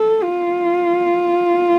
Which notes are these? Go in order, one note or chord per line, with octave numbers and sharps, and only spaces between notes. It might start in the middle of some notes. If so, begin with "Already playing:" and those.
Already playing: A4
F4